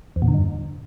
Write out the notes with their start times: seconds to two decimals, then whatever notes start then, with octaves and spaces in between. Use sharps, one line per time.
0.16 E2
0.22 A#2
0.28 D3
0.34 G2